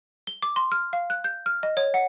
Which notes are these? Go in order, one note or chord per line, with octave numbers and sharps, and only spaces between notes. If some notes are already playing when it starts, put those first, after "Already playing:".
G7
D6
C6
F6
F5
F#6
G6
F6
D#5
C#5
F#5